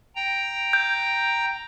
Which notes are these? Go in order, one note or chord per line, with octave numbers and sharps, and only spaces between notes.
G5 A#5
G6